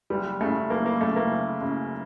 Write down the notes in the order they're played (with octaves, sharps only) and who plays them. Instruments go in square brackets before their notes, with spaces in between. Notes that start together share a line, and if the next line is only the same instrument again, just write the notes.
[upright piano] F#1 G3
C#3 A3
F#2
F#1 A#3
A#3
F#2 C#3 A3
A#3
F#1
F#2 C#3